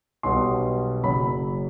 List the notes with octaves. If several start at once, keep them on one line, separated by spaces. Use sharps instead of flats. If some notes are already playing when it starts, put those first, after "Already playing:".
B1 B2 G3 B3 C6
F#1 F#2 F#3 B5